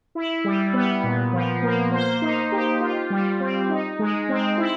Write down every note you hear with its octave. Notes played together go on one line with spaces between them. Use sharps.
E4
G3
B3
A#2
F3
A#3
C5
D#4
G4
F4
G3
C4
D#4
G#3
C4
E4